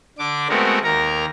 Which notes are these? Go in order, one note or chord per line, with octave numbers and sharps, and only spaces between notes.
D3 D4 D6
G#3 A3 B3 C4 F#4 A#4
D#2 A#4 A#5